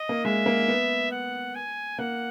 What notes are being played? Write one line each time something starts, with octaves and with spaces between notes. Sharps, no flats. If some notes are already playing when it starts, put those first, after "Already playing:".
Already playing: D#5
A#3
G#3 E5
A#3
B3
F#5
G#5
A#3 F#5